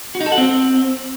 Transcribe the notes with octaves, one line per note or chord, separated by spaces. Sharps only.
F#4
D#4
A4
F#5
C4